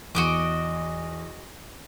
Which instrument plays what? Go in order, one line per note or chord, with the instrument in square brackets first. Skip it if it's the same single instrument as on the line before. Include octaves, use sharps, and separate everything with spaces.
[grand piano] E2 [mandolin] F#4 D#5 D6